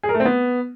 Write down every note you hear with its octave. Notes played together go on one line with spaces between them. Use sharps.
G#4
A#4
A3
C4
B3